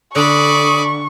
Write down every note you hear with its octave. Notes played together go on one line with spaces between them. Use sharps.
D3 D5 B5 C#6 D#6